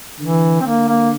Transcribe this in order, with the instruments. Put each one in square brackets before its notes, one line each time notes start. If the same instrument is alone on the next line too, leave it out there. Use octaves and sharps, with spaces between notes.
[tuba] D3 [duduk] E3
[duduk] C4
[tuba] D3 [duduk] A#3
[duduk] A#3